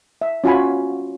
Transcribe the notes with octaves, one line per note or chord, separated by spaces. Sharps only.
E5
C#4 F4 F#4 G#5 B5